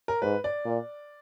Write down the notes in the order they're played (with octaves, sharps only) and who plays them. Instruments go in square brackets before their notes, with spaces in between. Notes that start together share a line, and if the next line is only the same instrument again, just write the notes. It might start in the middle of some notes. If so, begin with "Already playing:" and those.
[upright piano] A#4
[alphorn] G#2 [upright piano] B4
[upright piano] D5
[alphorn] A#2